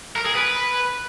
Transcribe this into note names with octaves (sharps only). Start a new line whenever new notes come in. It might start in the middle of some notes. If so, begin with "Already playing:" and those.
A#4
G#4
B4